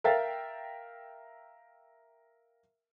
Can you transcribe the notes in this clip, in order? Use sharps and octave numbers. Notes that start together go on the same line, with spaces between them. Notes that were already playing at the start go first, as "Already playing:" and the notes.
A#4 E5 F5 G5 A6